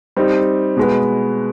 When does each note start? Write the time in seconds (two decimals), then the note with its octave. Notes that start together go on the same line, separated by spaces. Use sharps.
0.17 G3 C4 D#4
0.77 B2 G#3 B3